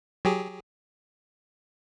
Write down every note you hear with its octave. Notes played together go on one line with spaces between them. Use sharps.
F#3 G4 G#4